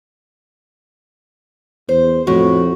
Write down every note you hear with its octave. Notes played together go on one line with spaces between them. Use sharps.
E2 C5
F2 A2 F#4